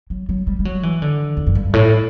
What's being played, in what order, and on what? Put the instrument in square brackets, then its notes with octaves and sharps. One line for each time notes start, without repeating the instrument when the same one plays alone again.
[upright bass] F#3
F#3
G3
G3
F#3
E3
D3
E2
F#2
G2
A2